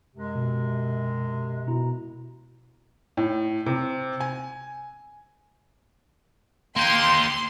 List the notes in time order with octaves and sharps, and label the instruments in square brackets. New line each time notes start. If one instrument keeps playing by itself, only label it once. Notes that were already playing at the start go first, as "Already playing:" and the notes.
[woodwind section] F#2 C3 G#3
[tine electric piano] B2
B2 E4 A#5
[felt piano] A2
C3
G#5
[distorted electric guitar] A#3 G4 [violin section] C6